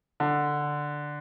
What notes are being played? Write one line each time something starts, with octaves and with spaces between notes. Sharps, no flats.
D3